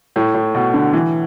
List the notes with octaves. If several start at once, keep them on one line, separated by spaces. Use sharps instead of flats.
A2
A2
B2
D3
E3